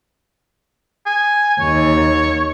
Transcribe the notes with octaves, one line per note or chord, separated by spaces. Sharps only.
G#5
D#2 C#5